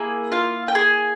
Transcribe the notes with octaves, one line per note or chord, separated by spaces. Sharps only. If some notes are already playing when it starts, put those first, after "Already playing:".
Already playing: A#3 E4 G#4
F4 F5
G5
G#4 G#5